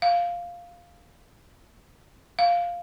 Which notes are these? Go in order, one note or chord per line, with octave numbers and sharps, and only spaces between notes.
F5
F5